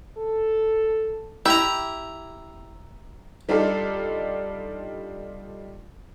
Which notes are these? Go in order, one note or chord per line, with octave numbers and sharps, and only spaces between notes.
A4
E4 G4 E5 A#5
G3 D4 D#4 F4 A4